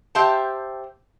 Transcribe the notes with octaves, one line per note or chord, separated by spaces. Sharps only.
G4 C5 E5 F5 A5